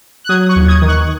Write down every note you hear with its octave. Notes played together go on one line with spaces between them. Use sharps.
F#6
F#3 D#6 G#6
C#6 F#6
D#2
D#6 G#6
D#3
C#6 F#6